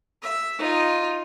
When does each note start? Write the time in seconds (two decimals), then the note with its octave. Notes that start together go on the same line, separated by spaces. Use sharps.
0.22 E5
0.59 D#4 F4